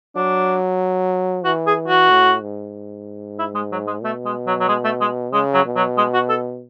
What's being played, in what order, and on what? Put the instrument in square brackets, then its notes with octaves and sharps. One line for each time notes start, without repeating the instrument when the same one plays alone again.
[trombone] F#3 [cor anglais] D4
[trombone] E3 [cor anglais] F#4
[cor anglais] G#4
F#4
[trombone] A2
G#2
[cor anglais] E4
G#3
F#3
G#3
[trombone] B2 [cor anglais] A3
[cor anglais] G#3
F#3
F#3
G#3
A3
G#3
[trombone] C#3 [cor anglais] G#3
[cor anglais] F#3
[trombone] B2
[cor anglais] F#3
G#3
F#4
A4